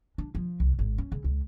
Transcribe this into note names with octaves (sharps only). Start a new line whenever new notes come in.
D4
F3
C2
G#1
C#4
C#3
C#2